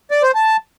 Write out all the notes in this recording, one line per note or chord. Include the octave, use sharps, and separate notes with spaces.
D5
C5
A5